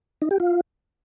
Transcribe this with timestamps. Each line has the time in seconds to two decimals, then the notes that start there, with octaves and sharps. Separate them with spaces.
0.22 D#4
0.31 G4
0.40 F4